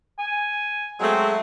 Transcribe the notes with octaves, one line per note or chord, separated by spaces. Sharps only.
G#5
F#3 G#3 A3 C4